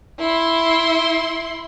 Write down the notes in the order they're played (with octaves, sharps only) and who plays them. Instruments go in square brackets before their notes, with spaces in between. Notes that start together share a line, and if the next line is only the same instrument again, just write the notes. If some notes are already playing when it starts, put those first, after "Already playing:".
[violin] E4 C6